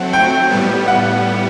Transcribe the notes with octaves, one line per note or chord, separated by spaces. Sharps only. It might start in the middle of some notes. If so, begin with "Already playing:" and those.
Already playing: F#3 A3 C4 F#5
G5
A2 G3 B3
F#5